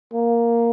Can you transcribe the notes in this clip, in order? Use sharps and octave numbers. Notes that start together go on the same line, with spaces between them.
A#3